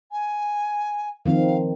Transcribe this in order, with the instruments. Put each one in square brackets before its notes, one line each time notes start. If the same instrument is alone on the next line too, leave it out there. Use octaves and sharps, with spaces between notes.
[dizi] G#5
[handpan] D#3 F3 C4 [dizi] F5